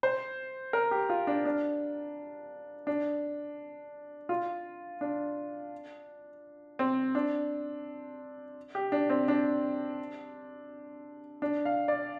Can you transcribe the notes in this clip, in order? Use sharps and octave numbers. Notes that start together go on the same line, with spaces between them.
C5
A#4
G4
F4
D4
D4
D4
F4
D4
C4
D4
G4
D4
C4
D4
D4
F5
D5